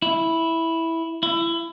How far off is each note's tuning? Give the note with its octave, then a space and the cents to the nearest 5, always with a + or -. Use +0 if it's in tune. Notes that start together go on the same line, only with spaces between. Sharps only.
E4 -5
E4 +25